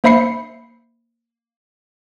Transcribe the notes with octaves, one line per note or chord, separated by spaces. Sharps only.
A#3 C5 E5 B5 C7 C#7